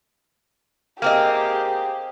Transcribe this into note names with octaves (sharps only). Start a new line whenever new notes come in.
A#3 C4 G4 G#4 D#5